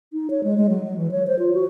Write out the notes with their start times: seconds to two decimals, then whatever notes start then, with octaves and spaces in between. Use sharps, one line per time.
0.13 D#4
0.30 C#5
0.44 G#3
0.58 G#3
0.69 F#3
0.84 F#3
0.97 E3
1.11 C#5
1.27 C5
1.39 F4
1.53 F#4